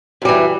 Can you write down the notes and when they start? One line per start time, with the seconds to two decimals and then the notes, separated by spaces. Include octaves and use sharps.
0.22 F#2
0.25 G3
0.29 E3